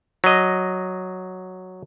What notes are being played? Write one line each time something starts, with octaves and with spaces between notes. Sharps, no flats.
F#3 D#5